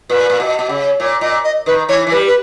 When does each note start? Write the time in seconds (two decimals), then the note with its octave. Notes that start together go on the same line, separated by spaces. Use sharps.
0.10 A#2 B4
0.30 A#2
0.40 B2
0.59 B2
0.69 C#3
1.00 A#2 C#5
1.21 A#2 D#5
1.44 D#5
1.66 D#3 B4
1.89 E3 C#5
2.07 E3
2.11 G3 B4
2.27 B4